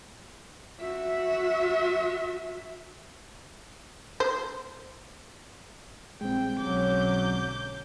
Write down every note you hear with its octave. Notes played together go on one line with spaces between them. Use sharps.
F#4 E5
C5
A#1 A#2 G3 G#3 C4 G5
B1 D3 F#3 C#4 D6 G6